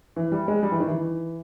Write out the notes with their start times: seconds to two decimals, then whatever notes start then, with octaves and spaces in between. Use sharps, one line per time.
0.16 E3
0.32 G3
0.48 G#3
0.63 G3
0.72 E3
0.80 D#3
0.88 E3